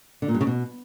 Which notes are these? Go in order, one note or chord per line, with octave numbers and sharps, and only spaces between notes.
D3
A#2
G2
C#3
B2